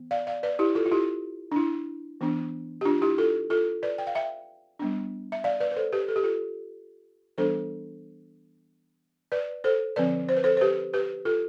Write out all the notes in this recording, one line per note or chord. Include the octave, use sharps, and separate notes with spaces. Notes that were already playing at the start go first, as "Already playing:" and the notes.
Already playing: E3 B3
D5 F5
D5 F5
B4 D5
E4 G4
F4 A4
F4
E4 G4
D4
E4
E3 B3 D4
G4
D4 F4
E4 G4
F4 A4
F4 A4
B4 D5
G5
F5
E5 G5
G3 B3 D4
E5
D5 F5
B4 D5
B4
A4 C5
G4 B4
A4
G4
F4 A4
E3 G3 B3 D4 A4 C5
B4 D5
A4 C5
D3 F3 C4 B4 D5
C5
B4
A4 C5
C5
G4 B4
G4 B4
F4 A4